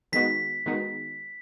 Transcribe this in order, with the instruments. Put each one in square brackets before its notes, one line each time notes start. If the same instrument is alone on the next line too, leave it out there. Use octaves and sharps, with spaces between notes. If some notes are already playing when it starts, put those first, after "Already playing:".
[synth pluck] D#3 G#3 B3 D#4 F#4 [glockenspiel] B6
[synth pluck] D#3 G#3 B3 D#4 F#4